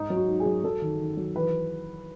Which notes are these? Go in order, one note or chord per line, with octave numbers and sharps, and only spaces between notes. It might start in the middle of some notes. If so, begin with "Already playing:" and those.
Already playing: G#2 D#4
F#3
F#4
G#2
G#4
F#3
F#3 A4
D#3
D#3
F#3
E3 B4